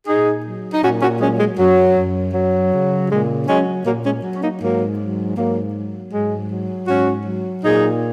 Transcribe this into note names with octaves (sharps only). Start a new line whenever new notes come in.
A#2 D#4 G#4
F#3
D#4
A#2 C#4 F#4
C#4 F#4
F#3 G#3 C#4
G#3
F#2 F#3
F#2
F#3
C#3
A#2 G#3
F#3 G#3 C#4
A#2 F#3 A#3
G#3 C#4
F#3
C#4
A#3 D#4
G#2 F#3 A#3
F#3
G#2 F#3 A#3
F#3
G#2 G#3
F#3
G#2 C#4 F#4
F#3
A#2 D#4 G#4